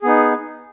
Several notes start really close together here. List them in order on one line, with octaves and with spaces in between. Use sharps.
G#4 B3 D#4